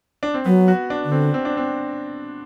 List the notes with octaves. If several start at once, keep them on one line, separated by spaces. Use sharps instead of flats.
D4
C4
F#3 B3
F#4
D4
D3
C4
C4
D4
C4